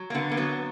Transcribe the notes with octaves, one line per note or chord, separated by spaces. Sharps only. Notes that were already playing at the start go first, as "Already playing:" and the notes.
Already playing: F#3
A#3
D3 B3
A#3
F#3 B3